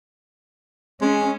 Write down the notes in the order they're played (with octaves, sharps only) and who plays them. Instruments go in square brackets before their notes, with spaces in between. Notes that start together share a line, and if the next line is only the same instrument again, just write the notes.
[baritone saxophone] G#3 [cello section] C#4